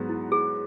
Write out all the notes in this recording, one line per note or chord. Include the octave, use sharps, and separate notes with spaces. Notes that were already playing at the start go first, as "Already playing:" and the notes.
Already playing: G#2 F#3 B3 F#4
E4
G#4